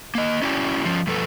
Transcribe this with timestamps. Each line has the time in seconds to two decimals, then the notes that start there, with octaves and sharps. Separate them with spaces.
0.15 A#3 D#5
0.42 C#4 E4 F#4 D5 F#5 G5
0.85 F3 C#4
1.07 G2 F3 A4 B4